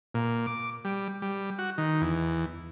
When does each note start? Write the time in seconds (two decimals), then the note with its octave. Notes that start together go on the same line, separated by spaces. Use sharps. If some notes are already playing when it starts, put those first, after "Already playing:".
0.15 A#2
0.46 D6
0.85 G3
1.22 G3
1.59 F#4
1.78 D#3
2.01 E2